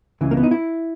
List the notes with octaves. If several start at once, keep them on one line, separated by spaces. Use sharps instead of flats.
C#2 C#3 E3
A#3
B3
D#4
E4